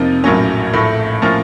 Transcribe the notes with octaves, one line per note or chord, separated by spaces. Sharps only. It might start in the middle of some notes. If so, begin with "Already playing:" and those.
Already playing: F2 C3 F3 A#3 D#4
A#1 A2 F#3 A#3 C#4
A#1 A2 A3
A2 F3 A#3 C#4 F4